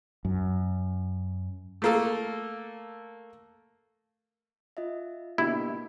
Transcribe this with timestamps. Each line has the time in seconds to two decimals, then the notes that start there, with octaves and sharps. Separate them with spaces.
0.25 F#2
1.82 A3 A#3 A4
4.77 F4 D#5 E5
5.38 B2 D3 A#3 E4 G4